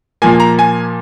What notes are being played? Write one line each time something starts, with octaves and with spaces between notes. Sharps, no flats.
A#2 F3 A#3 G#5
A#5
G#5